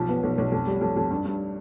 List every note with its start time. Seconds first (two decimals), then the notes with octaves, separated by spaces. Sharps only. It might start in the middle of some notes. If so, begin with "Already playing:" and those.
Already playing: B1 F3
0.09 B3
0.23 B1
0.38 B1
0.52 F2
0.67 G3
0.81 F2
0.97 F2
1.11 G2
1.25 G2